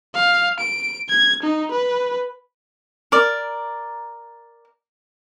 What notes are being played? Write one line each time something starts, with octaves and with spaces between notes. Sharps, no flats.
F5
D7
G#6
D#4
B4
A#4 D5